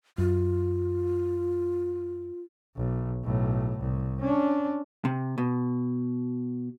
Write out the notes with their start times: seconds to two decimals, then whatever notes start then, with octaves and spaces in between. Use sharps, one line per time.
0.18 F#2 F4
2.77 B1
3.24 B1 A2
3.79 C2
4.20 C#4 D4
5.05 C3
5.38 B2